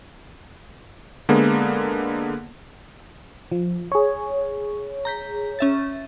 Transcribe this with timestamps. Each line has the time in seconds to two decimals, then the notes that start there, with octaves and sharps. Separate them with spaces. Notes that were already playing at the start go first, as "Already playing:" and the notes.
1.29 D3 G#3 A#3 B3
3.52 F3
3.92 G#4 C#5
5.05 A#5 G6 B6
5.59 C#4 E5 A6